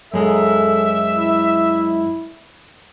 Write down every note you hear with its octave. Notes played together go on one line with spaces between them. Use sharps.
F#2 G#3 A4 E5
E4